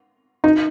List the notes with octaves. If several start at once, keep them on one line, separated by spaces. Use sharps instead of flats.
D#4